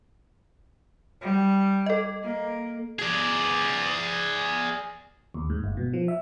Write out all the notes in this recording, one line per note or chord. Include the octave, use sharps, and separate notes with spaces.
G3
A4 D#5
A#3
G#4 D5
D#2
G#2
G1
B2
F3
E5